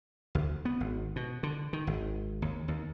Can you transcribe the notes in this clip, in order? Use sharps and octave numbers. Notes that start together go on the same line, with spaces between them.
D2
B3
G#1
B2
D3
D#3
G#1
D#2
D#2